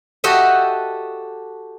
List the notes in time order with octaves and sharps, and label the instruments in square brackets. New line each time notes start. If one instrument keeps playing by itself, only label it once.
[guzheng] F#4 G4 A4 D#5 E5